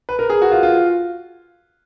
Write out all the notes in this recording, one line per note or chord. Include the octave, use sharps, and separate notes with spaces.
B4
A#4
G#4
F#4
F4
F4